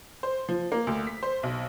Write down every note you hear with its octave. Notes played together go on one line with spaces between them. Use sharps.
C5
F3
A#3
D2
B6
C5
B1